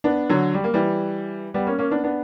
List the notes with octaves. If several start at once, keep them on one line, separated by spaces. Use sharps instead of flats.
B3 D4
D3 F#3
G3
A#3
E3 G3
G3 B3
A#3 C#4
A#3 C#4
B3 D4
B3 D4